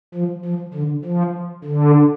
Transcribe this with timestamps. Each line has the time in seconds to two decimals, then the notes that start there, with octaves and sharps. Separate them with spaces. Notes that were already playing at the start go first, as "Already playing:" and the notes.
0.14 F3
0.45 F3
0.74 D3
1.05 F3
1.64 D3